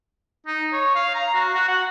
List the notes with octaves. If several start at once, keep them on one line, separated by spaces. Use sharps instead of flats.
D#4
C#5
F5
A#5
F#4
F#4
F#5